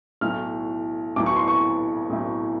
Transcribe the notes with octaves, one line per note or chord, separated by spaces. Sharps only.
B1 A2 F#3 F6
B1 A2 F#3 D6
C#6
C6
C#6
B1 A2 F#3